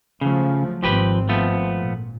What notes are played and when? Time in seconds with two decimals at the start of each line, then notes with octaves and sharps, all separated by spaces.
0.21 C#3 F3 F#3 A3
0.83 G#1 F3 C4 G4 B4
1.29 F3 A3 B3
1.79 A#2